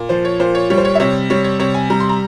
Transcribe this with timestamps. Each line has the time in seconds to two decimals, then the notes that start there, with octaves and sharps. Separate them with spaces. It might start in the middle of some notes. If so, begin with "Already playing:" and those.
Already playing: A#2
0.09 F3 C5
0.25 C#5
0.40 A#2 C5
0.55 C#5
0.70 G3 C#5
0.78 C5
0.85 C#5
0.95 E5
1.00 C3 C#5
1.30 G3 C#5
1.44 C#5
1.59 C3 C#5
1.74 G#5
1.90 G3 A#5
2.00 C6
2.09 A#5